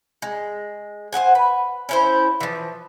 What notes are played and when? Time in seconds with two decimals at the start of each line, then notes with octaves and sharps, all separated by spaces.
0.22 G#3
1.13 C5 E5 F#5 G#5
1.35 B4
1.89 C#4 E4 C5
2.40 E3 F3